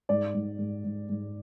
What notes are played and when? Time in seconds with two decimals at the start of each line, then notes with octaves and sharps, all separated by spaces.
0.09 G#2 D5
0.34 G#2
0.58 G#2
0.84 G#2
1.09 G#2